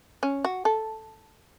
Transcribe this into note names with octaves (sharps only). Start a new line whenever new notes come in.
C#4
F#4
A4